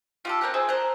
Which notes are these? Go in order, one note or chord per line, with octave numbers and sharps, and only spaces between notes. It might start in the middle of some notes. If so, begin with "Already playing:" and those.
F4 G4 A4
C4 A#4 D5 F#6
G#4 C5 E5
C5 A#5 F#6